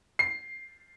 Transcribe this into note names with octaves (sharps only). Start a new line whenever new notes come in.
C7